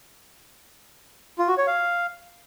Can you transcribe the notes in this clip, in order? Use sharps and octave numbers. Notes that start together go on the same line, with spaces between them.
F4
F#4
C#5
F5